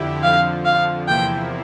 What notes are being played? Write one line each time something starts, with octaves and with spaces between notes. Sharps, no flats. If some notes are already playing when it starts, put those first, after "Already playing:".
Already playing: F2 D3 E4 G4
F2 D3 F3 F5
F5
E2 C3 F3 A#3 E4 G5